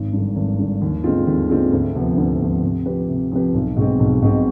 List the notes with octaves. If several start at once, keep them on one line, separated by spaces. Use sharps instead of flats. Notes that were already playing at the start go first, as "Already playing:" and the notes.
Already playing: G#1
G2 D3
G#1
G2 D3
D#2
D3 G#3 C4 F4
D#2
D3 G#3 C4 F4
D2
C3 F3 B3
D2
C3 F3 B3
C3
F3 C4 G4 B4
C3
F3 C4 G4 B4
B1
B2 G#3 C4
B1
B2 G#3 C4